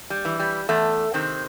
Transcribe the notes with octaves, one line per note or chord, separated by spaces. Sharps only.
G3
E3
G3
E2 A3
C3 D#3 C4